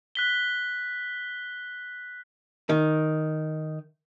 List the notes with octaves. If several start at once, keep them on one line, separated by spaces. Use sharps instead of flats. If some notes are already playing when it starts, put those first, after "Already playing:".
F#6 B6 G7
D#3